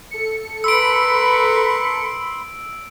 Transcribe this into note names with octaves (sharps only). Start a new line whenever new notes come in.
A4 C#7
A#4 B4 B5 C6 E6 D7